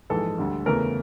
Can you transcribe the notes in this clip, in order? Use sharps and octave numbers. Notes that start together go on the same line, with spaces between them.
A#1 G#2 E3 G#3 A4
D2 D3 G3
E2 C#3 E3 A3 A#4